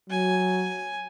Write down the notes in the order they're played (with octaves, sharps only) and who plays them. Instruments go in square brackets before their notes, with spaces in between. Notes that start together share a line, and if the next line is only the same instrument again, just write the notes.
[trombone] F#3 [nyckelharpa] G#5